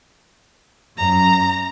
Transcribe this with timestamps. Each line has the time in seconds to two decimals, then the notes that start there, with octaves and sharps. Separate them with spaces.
0.98 F#2 A#5